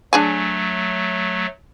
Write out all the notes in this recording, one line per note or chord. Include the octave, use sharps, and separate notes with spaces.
F#3 A3 D4 G#4 G#5